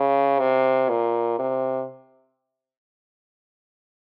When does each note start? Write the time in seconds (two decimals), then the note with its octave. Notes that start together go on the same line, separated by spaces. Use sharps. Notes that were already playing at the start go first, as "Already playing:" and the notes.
Already playing: C#3
0.39 C3
0.89 A#2
1.39 C3